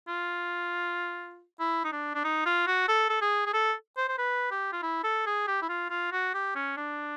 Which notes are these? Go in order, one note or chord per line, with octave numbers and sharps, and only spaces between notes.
F4
E4
D#4
D4
D4
D#4
F4
F#4
A4
A4
G#4
G#4
A4
C5
C5
B4
G4
F4
E4
A4
G#4
G4
E4
F4
F4
F#4
G4
C#4
D4